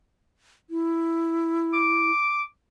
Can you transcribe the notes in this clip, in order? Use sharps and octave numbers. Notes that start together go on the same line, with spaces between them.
E4
D6